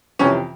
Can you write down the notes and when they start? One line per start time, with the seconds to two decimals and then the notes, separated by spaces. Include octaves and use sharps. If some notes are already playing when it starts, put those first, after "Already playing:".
0.19 F2 C3 E3 C#4